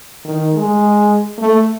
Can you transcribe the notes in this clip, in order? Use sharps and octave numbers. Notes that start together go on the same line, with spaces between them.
D#3
G#3
A3